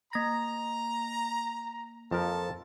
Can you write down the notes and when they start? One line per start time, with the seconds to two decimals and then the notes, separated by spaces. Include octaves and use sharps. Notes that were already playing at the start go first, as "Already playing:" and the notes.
0.13 A#3 A#5 A#6
2.11 F2 F3 A4 A#4 A5